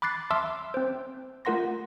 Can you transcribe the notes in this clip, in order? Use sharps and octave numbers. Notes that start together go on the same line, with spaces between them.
B5 D6 F#6 A6 C7
E5 A5 C6 D6 E6 F6
C4 C5
A3 F4 A#4 F#5 C6 A#6